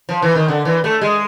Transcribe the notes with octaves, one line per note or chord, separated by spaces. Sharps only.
F3
E3
D#3
D3
E3
A3
G#3